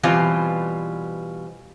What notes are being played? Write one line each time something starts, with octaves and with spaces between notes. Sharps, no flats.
B2 E3 G3 C4 F4